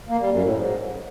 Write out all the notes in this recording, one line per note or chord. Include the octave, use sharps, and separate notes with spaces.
A#3
G3
F#2
A2
G#2